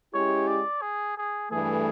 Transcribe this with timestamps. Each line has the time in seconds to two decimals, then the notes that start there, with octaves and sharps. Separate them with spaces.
0.14 G#3 C#4 E4 G4 C#5
0.47 D5
0.82 G#4
1.17 G#4
1.51 G2 E3 A3 G#4